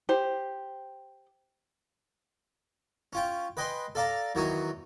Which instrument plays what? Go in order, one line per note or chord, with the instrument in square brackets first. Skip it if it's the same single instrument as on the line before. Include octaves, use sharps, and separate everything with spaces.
[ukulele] G4 C5
[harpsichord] C#4 F4 G5
B4 D#5 G5 G#5 B5 C6
A4 D5 F5 A5 A#5
E2 D#3 F#3 F#4 C#5 D#6